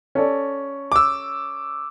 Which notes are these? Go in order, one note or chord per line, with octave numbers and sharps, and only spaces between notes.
C#4 A4 D5
D6 E6